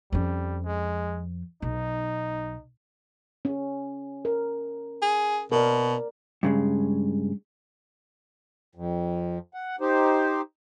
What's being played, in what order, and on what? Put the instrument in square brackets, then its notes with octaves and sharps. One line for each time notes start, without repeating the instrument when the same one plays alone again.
[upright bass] F2 C#4 [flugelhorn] G3
[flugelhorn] G#3
[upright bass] B1 [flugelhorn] D#4
[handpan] C#4
A#4
[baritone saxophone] G#4
[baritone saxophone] B2 [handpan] A#4 D5
[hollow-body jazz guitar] G2 C#3 G#3
[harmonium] F2
F#5
D#4 G4 C5